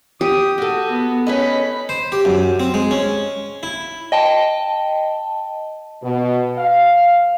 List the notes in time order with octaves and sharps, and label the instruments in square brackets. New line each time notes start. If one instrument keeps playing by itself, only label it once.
[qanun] G4 [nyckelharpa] D#6
[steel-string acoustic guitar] F#4 A4
[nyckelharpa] B3
[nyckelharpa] C#4 B5 [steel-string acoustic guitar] D#4 B4 D#5
[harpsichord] C5
G4
F#2
C4
G#3
C#4
E4
[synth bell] D#5 G5 A5
[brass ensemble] B2
F5